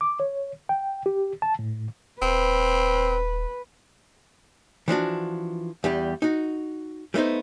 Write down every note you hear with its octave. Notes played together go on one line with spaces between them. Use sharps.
D6
C#5
G5
G4
A5
A2
D#1 C4 B4
E3 F3 D4 F#4
E2 G3 G4
D#4 F#4
G3 A3 B3 D#4 C5